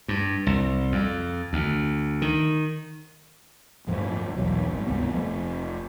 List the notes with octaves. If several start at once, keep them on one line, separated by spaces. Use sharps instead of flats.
G2
C2
F2
D2
D#3
D1 G2 F3
A#1 E2 B2 F#3
G#1 G#2
C#2 G2 C3 B3
F1 F3